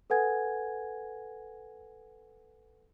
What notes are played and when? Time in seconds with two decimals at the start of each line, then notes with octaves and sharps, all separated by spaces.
0.10 A4 B4 F#5 G#5 G#6